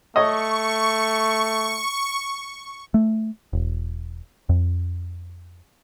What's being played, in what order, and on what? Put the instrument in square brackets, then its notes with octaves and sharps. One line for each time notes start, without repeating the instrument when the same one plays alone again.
[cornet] A3 [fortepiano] C#5 D#5 [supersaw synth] C#6
[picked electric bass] A3
E1
F2